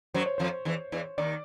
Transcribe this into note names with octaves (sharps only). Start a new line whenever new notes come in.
F#2 F#3 C5
C#5
F2 F3 C5
E2 E3
E2 E3
D#2 D#3 D5